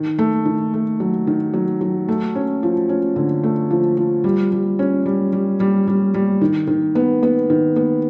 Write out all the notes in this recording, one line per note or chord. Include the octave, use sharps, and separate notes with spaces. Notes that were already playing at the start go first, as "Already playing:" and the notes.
Already playing: D#3
A3
D#3
A3
F#3
D#3
F#3
F#3
A3
C#4
F3
C#4
D3
A3
F3
F3
G3
G3
C#4
G3
G3
G3
G3
G3
D#3
D#3
B3
B3
D#3
B3